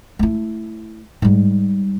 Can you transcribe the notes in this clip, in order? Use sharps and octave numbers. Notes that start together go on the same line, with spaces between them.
A3 E4
G#2 G3